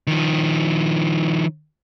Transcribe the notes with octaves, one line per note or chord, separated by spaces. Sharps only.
D#3 F3